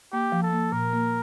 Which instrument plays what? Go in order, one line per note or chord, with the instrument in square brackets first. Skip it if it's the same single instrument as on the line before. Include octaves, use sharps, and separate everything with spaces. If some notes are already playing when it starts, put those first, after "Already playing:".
[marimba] A#3 [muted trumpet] G4
[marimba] F3
[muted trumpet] A4
[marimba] A#3
[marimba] A#2 [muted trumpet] A#4
[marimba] A#3